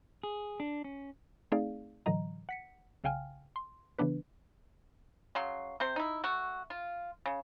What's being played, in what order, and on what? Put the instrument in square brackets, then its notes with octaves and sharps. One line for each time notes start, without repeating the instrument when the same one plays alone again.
[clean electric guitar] G#4
D4
C#4
[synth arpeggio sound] A3 C4 D#4 G#4 D5 F5
A2 D3 E3 F#3 D#5 A#5
F#5 B6 C#7
B1 C#3 F5 G5 G#5 F6
C6
C#3 E3 B3 D4 B4
[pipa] C#3 F#3 C6
C3 C4 C5
D#4 E4
A3 F#4
F4
C#3